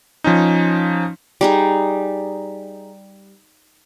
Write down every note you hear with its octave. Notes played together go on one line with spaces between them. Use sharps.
F3 C#4 D#4
G3 D#4 G#4